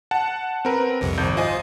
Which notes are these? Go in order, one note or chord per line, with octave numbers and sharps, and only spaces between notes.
F#5 A5
C4 A#4 B4
C2 F2 C3
G#1 G6
F4 C5 D#5 G#5